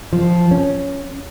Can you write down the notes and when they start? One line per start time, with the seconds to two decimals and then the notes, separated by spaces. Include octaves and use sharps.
0.13 F3
0.51 C#4